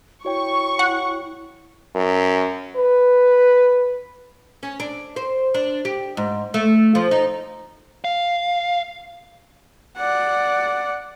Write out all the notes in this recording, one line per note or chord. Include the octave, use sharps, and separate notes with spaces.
E4 F#4 C#5 G5 C#6
F#5
F#2
B4
C#4
D4
C5
D4
G4
G#2
A3
F3
D#4
F5
D5 F#5